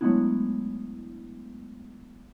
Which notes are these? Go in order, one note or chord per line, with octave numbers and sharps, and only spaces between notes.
F#3 G#3 A3 B3 D4 E4